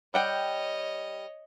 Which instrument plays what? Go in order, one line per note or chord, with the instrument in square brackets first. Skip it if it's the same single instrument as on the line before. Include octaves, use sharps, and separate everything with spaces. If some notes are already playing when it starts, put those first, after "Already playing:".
[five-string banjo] G3 F#5 G5 [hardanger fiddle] C#5 D#5